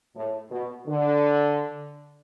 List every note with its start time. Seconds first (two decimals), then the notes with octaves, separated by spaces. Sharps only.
0.15 A2
0.51 B2
0.87 D3